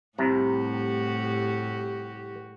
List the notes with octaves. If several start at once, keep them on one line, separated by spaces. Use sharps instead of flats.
C2 A2 C3 F#4 G4 A#5